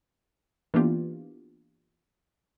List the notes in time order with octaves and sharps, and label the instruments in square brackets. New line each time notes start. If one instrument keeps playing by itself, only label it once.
[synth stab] E3 A#3 B3 D4 F4 G4